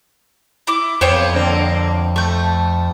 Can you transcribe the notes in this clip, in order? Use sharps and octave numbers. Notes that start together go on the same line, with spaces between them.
E4 D6
F2 B3 C5 C#5 G5
D3 A#3 C4
A3 C#6 G6